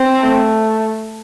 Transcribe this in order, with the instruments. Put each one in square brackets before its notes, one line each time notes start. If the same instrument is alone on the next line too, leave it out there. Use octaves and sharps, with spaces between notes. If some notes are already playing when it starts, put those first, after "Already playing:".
Already playing: [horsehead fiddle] C4
[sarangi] A3